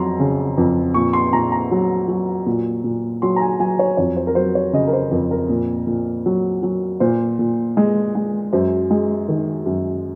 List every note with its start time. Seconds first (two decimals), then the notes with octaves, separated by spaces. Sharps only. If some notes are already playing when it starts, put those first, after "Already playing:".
Already playing: F2 F#3 A#5 C6
0.20 C#3
0.58 F2
0.94 A#2 C#6
1.13 C6
1.33 A#2 A#5
1.52 A#5
1.71 F#3
2.08 F#3
2.46 A#2
2.84 A#2
3.22 F#3 C6
3.36 A#5
3.41 G#5
3.60 F#3 G#5
3.79 C#5
3.97 F2 C#5
4.17 C5
4.27 A#4
4.35 F#3 C5
4.55 C#5
4.73 C#3 D#5
4.87 A#4
4.93 C5
5.11 F2 A#4
5.31 A#4
5.49 A#2
5.87 A#2
6.26 F#3
6.63 F#3
7.00 A#2 C5
7.39 A#2
7.77 G#3
8.15 G#3
8.53 F#2 C5
8.91 G#3
9.29 D#3
9.66 F#2